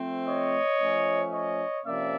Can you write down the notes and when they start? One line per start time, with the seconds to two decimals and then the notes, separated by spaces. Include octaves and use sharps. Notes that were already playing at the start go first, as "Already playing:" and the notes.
Already playing: F3 A3 C4
0.27 C#5 D#5
0.79 F3 A3 C#4
1.32 C#5 D#5
1.85 C3 F3 A#3 C#4 D5 E5